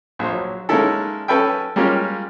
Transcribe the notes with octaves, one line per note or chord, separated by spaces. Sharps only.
A#1 C5
F#3
G#3 A#3 C#4 D#4 E4 A4
C#4 A4 B4 E5 G5
G3 G#3 A#3 C#4 F4 G4